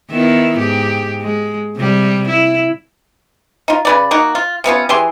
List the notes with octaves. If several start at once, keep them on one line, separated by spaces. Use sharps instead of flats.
D#3 B3 E4
G#2 G4
G#3
C3 G3
E4
D#4 F4
C#3 B4 D5
A#3 D#4 F#4
F4
C3 B3 C#4 F4
E3 G4 G#4 C6